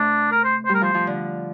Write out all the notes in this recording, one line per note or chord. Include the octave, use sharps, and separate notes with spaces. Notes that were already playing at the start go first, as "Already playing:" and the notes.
Already playing: C3 A3 D4
A#4
C5
C5
G3
A#4
F3 C5
F3
D3